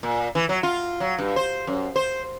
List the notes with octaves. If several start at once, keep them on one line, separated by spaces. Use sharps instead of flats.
A#2
E3
F#3
F4
F#3
G2
C5
F#2
C5